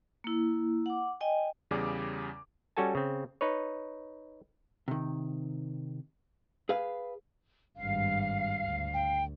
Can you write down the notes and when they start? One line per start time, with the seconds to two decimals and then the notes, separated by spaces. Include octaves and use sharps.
0.24 A#3 E4
0.86 F#5 D6
1.21 D#5 G5 G#5
1.71 E2 C#3 G3 G#4 D5 D6
2.77 G3 C#4 F#4 A4 G#5 A5
2.95 C#3 C4
3.41 D#4 B4 C#5
4.88 C3 D#3
6.69 G#4 B4 F5
7.77 G#1 G2 F5
8.64 D2
8.94 G5